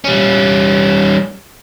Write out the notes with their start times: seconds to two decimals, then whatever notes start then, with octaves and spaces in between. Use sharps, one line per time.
0.04 G3 C#4